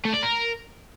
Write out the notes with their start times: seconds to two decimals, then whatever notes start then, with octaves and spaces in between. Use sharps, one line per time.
0.05 A3
0.14 D5
0.23 A#4